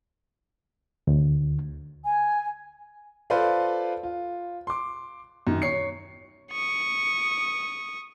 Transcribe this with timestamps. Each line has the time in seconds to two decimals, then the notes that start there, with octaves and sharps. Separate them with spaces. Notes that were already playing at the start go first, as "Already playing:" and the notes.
1.07 D2
2.05 G#5
3.30 F4 A4 B4 C5 D5 F5
4.03 F4
4.67 C6 D6
5.47 F#2 D#3
5.62 C#5 C7 C#7
6.52 C#6 D#6